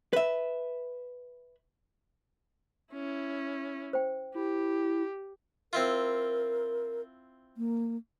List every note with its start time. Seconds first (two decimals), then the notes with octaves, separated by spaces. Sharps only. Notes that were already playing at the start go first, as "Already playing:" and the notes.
0.13 B4 E5
2.93 C#4 E4
3.93 C5 G5
4.35 E4 G4
5.73 C4 E4 F4 A#4
7.57 A#3